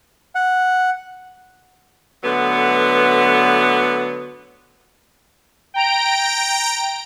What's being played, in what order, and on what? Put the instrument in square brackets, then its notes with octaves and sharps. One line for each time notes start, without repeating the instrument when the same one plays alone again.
[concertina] F#5
[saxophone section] D3 F#3 A3 B3
[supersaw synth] G5 A#5 D7